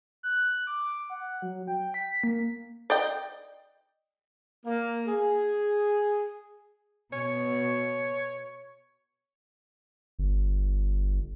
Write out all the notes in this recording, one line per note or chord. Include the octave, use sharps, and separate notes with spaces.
F#6
D6
F#5
F#3
G5
B6
A#3
D5 D#5 G5
A#3
G#4
B2 C#5
G1